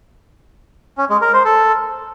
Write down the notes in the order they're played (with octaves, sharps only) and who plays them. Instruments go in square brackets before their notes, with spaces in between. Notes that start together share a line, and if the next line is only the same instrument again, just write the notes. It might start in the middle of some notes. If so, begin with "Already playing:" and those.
[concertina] C#4
G#3
A#4
C5
A4